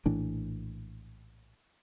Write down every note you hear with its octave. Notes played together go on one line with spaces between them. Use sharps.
A#1 A2 E3 D4